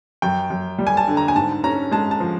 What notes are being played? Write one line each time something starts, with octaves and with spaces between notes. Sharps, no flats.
F#2 G5
F#2
G3
G#5
A5
D3
A#5
G#5
G#2 A5
C#4 A#5
G#3 A5
A5
F3